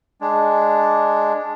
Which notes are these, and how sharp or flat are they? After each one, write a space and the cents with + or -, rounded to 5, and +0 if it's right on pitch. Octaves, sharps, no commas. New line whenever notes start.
G#3 +0 D4 +0